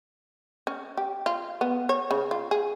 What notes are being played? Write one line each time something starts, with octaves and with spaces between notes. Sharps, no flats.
C#4
G4
F4
B3
C#5
C#3
F4
G#4